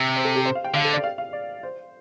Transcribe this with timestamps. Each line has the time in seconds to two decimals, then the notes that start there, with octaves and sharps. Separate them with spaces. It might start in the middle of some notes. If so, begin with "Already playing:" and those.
Already playing: C3
0.16 C5
0.25 A4
0.35 G4
0.45 C5
0.55 F5
0.64 G5
0.74 D3 F5
0.84 A4
0.94 D5
1.04 F5
1.18 F5
1.33 D5
1.63 C5